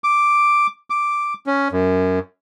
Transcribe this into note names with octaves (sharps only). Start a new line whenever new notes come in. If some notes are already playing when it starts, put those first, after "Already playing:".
D6
D6
C#4
F#2